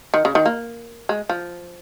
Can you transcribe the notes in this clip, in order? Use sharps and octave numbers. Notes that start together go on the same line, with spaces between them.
D#3
C#3
D#3
A#3
G#3
F3